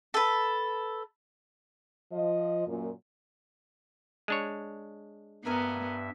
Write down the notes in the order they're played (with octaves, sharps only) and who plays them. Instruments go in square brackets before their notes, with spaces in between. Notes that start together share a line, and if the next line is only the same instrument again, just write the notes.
[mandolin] A4 B4
[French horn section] F3 D#5
F#2 A#2
[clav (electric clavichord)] G#3 D4 C#5
[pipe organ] G2 E5 [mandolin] A#3 A#4 G#5 [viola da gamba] B3